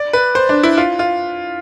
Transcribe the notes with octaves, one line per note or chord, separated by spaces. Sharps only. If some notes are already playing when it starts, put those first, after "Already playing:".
Already playing: D5
B4
C5
D4
E4
F4
F4